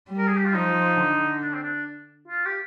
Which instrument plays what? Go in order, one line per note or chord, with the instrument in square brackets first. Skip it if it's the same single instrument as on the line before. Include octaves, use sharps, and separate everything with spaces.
[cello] G3
[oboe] A#4
G#4
G4
F4
[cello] F3 [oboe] D#4
[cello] D3
[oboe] D4
C4
D4
F4
G4